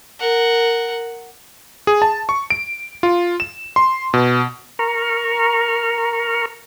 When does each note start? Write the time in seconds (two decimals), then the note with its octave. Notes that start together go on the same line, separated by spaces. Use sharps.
0.20 A#4 F#5
1.87 G#4
2.02 A5
2.29 C#6
2.50 D7
3.03 F4
3.40 E7
3.76 C6
4.14 B2
4.79 A#4 A#5 C#6 F6